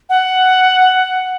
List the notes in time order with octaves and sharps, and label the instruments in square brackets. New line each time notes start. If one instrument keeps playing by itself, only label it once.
[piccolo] F#5